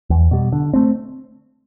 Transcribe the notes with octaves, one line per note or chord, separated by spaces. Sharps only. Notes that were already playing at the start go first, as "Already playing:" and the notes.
E2
B2 G3
D3
A3 C4